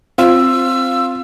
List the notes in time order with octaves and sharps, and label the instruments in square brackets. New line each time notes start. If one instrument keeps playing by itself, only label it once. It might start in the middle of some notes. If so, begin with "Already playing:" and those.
[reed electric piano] C4 [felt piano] F4 [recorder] E6